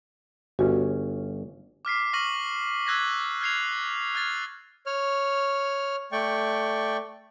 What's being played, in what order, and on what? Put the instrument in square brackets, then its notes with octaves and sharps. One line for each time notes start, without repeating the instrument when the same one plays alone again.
[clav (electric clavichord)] G1 C#4 [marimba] F#4
[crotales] D6 F6 B6 C7
C#6 F6 A#6 D#7 F#7
E6 F#6 G#6 A#6 B6
F6 G#6 C7 F7
F6 G#6 A6
[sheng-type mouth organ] C#5 F6
A3 D5 G5 C#6